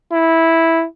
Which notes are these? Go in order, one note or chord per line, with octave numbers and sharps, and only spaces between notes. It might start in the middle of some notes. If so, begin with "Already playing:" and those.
E4